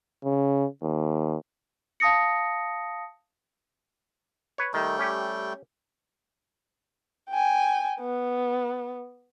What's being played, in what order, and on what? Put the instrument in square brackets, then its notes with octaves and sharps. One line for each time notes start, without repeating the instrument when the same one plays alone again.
[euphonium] C#3
D#2
[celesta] F5 A5 D#6 A#6 C#7
[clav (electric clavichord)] B4 C#5
[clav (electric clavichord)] D#3 [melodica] G3 A3 G5
[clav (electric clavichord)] C#4 G4
[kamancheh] G5 G#5
B3